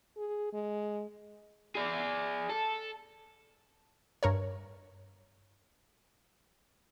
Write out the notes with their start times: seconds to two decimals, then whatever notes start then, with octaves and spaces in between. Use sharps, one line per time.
0.17 G#4
0.53 G#3
1.75 G#4 D5
2.49 A4
4.23 G2 A#4 C#5